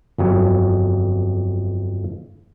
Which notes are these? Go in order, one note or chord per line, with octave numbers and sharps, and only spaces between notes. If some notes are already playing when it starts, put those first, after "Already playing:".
G1 F2 F#3